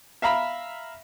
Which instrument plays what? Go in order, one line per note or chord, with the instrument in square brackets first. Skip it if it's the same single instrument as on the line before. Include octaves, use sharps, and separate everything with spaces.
[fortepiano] E5 F5 A#5 B5